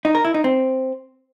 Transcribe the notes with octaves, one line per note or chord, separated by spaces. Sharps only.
D#4
A#4
E4
D#4
C4